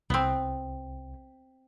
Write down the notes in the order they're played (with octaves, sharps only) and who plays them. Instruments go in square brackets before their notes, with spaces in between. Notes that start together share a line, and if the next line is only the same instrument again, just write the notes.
[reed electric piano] C2 [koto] B3 C4